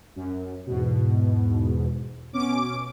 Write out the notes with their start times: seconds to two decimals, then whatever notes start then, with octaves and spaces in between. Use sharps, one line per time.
0.16 F#2
0.66 E2 G#2 B2
2.33 B2 C#4 D6 D7